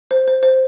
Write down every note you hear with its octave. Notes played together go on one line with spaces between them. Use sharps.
C5
C5
C5